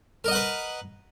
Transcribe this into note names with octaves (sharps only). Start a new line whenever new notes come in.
A#4 B4 D#5 F#5